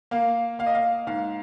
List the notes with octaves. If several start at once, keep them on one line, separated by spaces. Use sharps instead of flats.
A#3 F5
A#3 F5
D#5
F5
G#2 F5